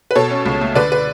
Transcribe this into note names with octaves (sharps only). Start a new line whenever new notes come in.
B4
B2 A4 C#5
C#4
C#2
A3
D3 B4 D5
B4